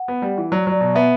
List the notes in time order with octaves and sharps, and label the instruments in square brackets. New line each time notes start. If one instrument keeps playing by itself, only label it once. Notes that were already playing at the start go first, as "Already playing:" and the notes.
Already playing: [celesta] F#5
[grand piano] B3
G3
E3
[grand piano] F#3 [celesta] D5
[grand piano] F#3
[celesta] D5
[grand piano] B2
[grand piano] B3 [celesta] E5